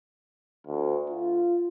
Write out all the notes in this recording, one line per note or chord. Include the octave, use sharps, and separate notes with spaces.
D2
F4